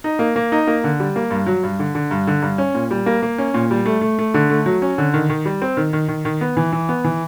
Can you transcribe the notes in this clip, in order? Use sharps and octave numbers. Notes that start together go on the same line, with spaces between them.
D#4
A#3
A#3
D#4
A#3
D3
G3
A#3
G2
F#3
G2
D3
D3
G2
D3
G2
C#4
A#2
G3
A#3
A#3
C#4
A#2
G3
A3
A3
A3
D3
A3
F#3
C#4
D3
D#3
D#3
G3
C4
D#3
D#3
D#3
D#3
B3
E3
E3
B3
E3